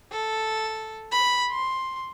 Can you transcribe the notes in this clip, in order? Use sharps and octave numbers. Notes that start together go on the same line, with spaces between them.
A4
B5
C6